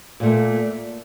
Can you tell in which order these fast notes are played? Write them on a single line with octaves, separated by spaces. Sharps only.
A#2 A3 A#3